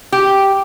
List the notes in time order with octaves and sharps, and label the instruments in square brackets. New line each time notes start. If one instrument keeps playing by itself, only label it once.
[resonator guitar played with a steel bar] G4